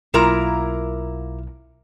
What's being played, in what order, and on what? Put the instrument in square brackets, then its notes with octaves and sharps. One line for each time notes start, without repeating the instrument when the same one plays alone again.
[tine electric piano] B1 [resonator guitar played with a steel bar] A#3 A#4 A#5 [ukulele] E4 F4